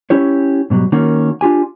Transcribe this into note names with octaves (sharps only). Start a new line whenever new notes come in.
C#4 E4 G4 C#5
G#2 B2 D#3 F#3 G3
D#3 A#3 C#4 F#4
D4 F4 G4 G#5